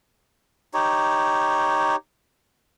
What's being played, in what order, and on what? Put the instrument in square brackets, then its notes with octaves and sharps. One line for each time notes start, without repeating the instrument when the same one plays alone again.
[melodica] D#4 G4 C#5